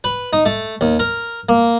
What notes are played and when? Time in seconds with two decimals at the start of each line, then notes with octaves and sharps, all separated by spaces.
0.04 B4
0.33 D#4
0.46 A3
0.81 D#2
0.99 A#4
1.49 A#3